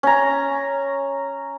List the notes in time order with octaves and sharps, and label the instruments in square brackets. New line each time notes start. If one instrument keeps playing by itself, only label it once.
[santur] C#4 A#5